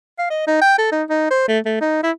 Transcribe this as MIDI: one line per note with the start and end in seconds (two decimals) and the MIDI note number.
0.19 0.27 77
0.30 0.47 75
0.47 0.61 63
0.61 0.76 79
0.78 0.91 69
0.92 1.03 63
1.10 1.27 63
1.31 1.48 72
1.48 1.59 57
1.66 1.79 57
1.81 1.99 63
2.03 2.11 64